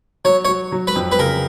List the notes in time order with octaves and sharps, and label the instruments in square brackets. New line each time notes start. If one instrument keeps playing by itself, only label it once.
[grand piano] F#3 [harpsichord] C#5
[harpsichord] C#5
[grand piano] F#3
F#3
[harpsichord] B4
[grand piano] F2
[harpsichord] B4
[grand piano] C#3 [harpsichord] A#4